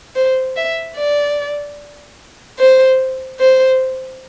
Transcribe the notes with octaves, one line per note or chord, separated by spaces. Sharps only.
C5
E5
D5
C5
C5